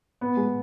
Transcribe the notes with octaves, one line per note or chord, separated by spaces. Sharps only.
B3
G#3